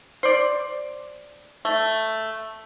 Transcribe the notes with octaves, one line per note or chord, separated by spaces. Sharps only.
C5 D5
A3